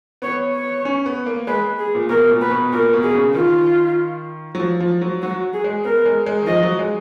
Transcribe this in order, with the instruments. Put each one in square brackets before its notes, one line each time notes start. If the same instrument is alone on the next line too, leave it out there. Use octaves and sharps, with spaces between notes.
[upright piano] B3 [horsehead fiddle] C#5
[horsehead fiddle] C#5
[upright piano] C#4
B3
A#3
[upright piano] G#3 [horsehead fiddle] B4
[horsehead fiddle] G#4
[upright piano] A#2
[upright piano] B2 [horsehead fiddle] A#4
[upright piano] A#2
[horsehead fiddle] B4
[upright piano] B2
[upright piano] A#2 [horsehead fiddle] A#4
[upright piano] B2
[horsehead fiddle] G#4
[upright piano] C#3
[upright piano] D#3 [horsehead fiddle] F4
[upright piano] F#3
F3
F3
F#3
[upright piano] F#3 [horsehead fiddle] F#4
[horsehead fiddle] G#4
[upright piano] G#3
[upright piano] B3 [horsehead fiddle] A#4
[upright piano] G#3
G#3
D#3
[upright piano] F3 [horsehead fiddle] D#5
[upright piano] F#3
G#3